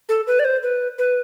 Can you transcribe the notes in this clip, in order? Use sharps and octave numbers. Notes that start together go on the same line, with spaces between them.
A4
B4
D5
C5
B4
B4